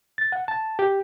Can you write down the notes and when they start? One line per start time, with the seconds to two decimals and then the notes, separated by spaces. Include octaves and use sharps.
0.18 A6
0.32 F#5
0.48 A5
0.79 G4